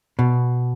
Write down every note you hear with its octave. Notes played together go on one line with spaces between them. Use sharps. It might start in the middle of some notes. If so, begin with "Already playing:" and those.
B2